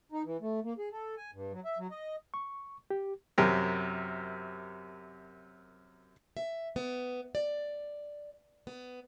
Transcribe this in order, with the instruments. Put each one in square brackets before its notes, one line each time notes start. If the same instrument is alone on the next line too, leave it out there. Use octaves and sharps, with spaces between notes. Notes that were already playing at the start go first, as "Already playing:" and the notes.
[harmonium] D#4
E3
A3
A#3
G#4
A4
G#5
G2
F#3
E5
F#3
D#5
[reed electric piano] C#6
G4
[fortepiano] F#2 C3 A#4
[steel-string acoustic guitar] E5
B3
D5
B3